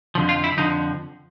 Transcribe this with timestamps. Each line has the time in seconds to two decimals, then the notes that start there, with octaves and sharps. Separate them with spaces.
0.15 F2 D3 F3
0.29 F4
0.44 E4
0.57 F2 D3 F3 D#4